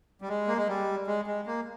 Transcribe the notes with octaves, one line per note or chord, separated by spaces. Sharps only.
G3
G#3
A#3
G#3
G3
G#3
G#3
A#3